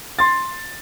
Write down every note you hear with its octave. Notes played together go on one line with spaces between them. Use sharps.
C6 A6